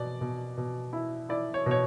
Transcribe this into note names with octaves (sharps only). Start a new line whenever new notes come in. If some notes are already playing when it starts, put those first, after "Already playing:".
Already playing: B2 D5
B2
B2
E4
E4 D5
C#5
B2 C#5